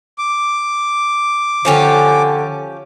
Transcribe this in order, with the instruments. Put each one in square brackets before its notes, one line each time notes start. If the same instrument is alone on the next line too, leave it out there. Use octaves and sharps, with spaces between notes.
[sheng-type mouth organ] D6
[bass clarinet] D3 [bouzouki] F3 C#4 G4